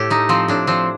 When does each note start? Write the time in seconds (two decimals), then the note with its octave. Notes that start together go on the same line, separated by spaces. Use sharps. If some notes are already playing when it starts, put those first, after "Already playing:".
Already playing: A2 G4 A4
0.10 A3 D#4
0.29 F3 C4
0.48 A2 D4
0.67 F3 C4